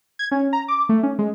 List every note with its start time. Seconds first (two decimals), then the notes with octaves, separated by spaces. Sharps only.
0.19 G#6
0.31 C#4
0.53 A#5
0.68 D6
0.89 A3
1.03 C#4
1.19 G#3